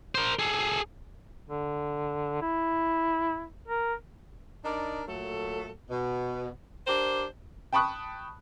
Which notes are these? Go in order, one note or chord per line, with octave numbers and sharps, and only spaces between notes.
A#4 C5
G#4 A4
D3
E4
A#4
D4 D#4 A#4 D5
A#2 F#3 A3 A4
B2
D4 G4 A#4 C5
G5 A5 B5 C#6 D#6 F#6